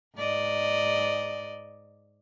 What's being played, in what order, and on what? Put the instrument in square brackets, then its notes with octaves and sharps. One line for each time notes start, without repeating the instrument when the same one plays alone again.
[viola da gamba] G#2 D5 D#5